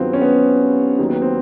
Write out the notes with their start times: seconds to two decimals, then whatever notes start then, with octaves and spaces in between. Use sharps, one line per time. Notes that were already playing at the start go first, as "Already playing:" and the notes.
Already playing: G2 D#3 F#3 B3 C4 F4
0.13 C#4
0.21 B3
0.98 D#2 D#3 F#3
1.09 B3
1.22 C4